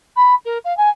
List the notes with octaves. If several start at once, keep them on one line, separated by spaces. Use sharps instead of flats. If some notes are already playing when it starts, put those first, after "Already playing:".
B5
A#4
F5
G#5